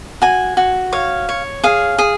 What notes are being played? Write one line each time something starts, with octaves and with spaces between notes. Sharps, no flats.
F#4 G#5
F#4
C#5 F5
C#5
G#4 F5
G#4